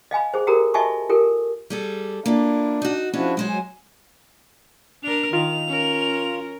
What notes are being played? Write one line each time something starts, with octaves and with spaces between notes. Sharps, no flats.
D#5 F5 G#5 B5
G#4 C5
F#4 G4 A4 A#4 A#5
F#4 D#5 E5 G#5 A5 C#6
F4 G4 A4 A#4
G3 G#4 A4
A#3 D4 E4 F4
D#4 F#4
F3 C#4 D4 E4 F#4 G#4
F#3 G#3 C5 C#5
F#3 G#5
D4 A#4 F7
D#3 F4 F7
C#4 A#4